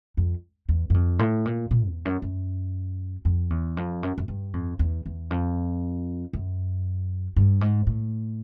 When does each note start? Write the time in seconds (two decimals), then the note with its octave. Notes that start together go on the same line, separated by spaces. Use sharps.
0.17 F2
0.69 E2
0.90 F#2
0.94 F2
1.19 A2
1.45 A#2
1.71 A#2
1.88 E2
2.05 F#2
2.22 F#2
3.25 F2
3.50 E2
3.77 F2
4.03 F#2
4.18 F#2
4.28 G2
4.53 F2
4.79 E2
5.06 E2
5.30 F2
6.33 F#2
7.36 G2
7.61 G#2
7.87 A2